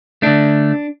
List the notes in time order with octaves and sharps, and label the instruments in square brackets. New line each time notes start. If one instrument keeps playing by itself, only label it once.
[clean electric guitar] D3 A3 D4